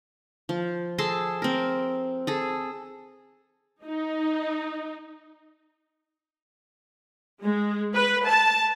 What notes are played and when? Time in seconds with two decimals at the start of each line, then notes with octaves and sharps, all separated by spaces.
0.49 F3
0.98 G#4 A4 A5 C6
1.42 C4 A#4
2.27 G#4 A4
3.84 D#4
7.42 G#3
7.94 B4
8.27 A5